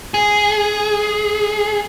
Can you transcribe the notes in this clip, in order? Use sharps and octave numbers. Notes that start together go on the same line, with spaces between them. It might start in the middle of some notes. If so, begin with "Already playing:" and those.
G#4